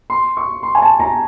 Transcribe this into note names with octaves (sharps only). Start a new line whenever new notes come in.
C6
C#6
C6
G#5
A5
A#5